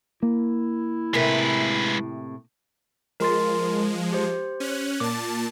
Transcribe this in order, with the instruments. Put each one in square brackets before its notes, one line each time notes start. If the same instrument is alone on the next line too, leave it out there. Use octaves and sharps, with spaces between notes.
[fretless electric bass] A#3 [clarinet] E4
[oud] A2 C3 A#4 [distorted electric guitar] G#3 B4
[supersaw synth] F3 G#3 [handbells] A#4 C6 A6
[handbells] G4 C5
[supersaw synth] C#4 F#6
[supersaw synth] A#2 A5 [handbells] D6